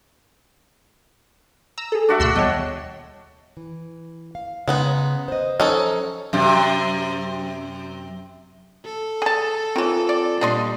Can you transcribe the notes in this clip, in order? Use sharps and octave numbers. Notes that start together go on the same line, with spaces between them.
A#5 E6
G#4 A4
D4 F#4 E5
D2 B2 C6 E6 F#6
D#2 G3 B3 C#5 D#5 G5
E3
F5
C#3 G#3 B3 D#4
C5 D#5
F3 F#3 C#4 D#4 A4 C5
F#2 C3
A4
G#4 A5
D#3 E3 C4 F4 C#5
D5
A#2 G3 D4 D#5 C6